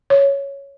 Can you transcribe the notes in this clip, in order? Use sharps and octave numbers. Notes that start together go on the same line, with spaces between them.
C#5